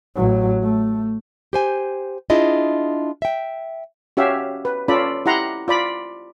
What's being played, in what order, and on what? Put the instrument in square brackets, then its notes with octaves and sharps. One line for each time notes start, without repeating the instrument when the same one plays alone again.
[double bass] A1 F#3
A3
[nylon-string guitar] G4 C5 G#5
D4 E4 F4 G#4 D#5
E5 G5
[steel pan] C#4 F#4 G4 C#5 E5 F5
B4
C#4 F4 A4 D5 B5
E4 G4 F#5 A#5 C6
F4 D5 B5